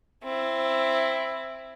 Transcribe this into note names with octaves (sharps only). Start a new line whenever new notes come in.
C4 E4